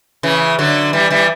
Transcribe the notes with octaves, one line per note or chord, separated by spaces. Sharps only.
C#3 E3
D3 F#3
E3 G3
E3 G3